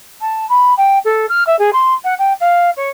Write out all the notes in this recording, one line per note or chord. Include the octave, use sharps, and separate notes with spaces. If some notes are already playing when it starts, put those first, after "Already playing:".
A5
B5
G5
A4
F6
E5
G#4
C6
F#5
G5
F5
C#5